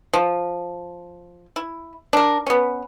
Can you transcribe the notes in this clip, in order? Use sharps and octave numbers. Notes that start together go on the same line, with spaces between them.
F3
E4
D4 A#4
B3 C#4